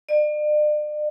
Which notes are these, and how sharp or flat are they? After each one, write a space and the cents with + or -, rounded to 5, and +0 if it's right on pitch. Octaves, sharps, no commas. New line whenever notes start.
D5 +40